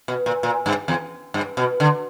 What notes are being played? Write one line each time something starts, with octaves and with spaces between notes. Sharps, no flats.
B2
A#2
A#2
G2
E2
G2
B2
D3